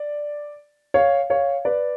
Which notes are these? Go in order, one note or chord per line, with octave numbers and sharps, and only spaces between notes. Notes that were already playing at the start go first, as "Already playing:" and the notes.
Already playing: D5
C#5 F5
C#5 F5
B4 D5